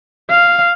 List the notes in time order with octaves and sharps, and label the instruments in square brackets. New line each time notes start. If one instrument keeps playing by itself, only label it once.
[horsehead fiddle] F5